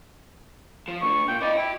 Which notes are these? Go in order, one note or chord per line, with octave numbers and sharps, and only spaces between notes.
F3
D2 D3 C#6
A#2 G5
E4 D5 D#5
E4 F#4 G5